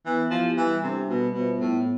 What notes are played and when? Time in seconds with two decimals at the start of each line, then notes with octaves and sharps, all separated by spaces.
0.06 E3 B3
0.31 F3 E4 G4
0.57 E3 G3
0.83 C3 D4 A4 C5 E5
1.09 B2 G3
1.34 B2 B3 F4 C5 E5
1.60 A2 B3